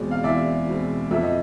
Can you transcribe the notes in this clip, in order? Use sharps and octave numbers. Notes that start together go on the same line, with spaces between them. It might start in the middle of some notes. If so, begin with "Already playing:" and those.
Already playing: E2 B2 G#3 C4 D5
F5
E2 D5 E5
B2 G#3 C4
F2 E5
D#5